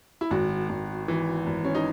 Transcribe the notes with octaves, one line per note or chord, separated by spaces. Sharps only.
E4
G#1 F#4
G#1
E3
G#1
C#4
D#4